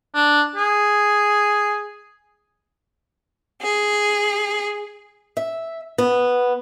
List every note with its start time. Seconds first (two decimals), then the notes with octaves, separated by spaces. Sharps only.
0.15 D4
0.56 G#4
3.62 G#4
5.37 E5
5.98 B3